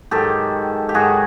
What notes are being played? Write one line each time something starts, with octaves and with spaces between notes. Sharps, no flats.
G#2 D#3 F#3 G4 A4
G4
G#2 D#3 F#3 F#4 G#4